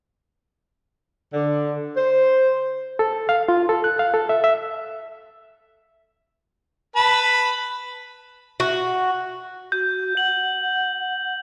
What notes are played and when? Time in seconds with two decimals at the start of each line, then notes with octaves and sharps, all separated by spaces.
1.33 D3
1.97 C5
2.99 A4
3.29 F5
3.49 F4
3.69 A4
3.84 F#6
3.99 F5
4.14 A4
4.29 E5
4.44 E5
6.96 B4 A5 B5
8.60 F#4
9.72 F#4 G6
10.17 F#5 F#7